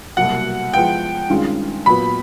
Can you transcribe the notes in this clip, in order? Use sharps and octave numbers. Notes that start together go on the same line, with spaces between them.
C2 B2 F#3 A#3 F#5
F3 G#3 B3 E4 G5
G2 D#3 G#3 C#4 F4
A#2 F#3 B3 B5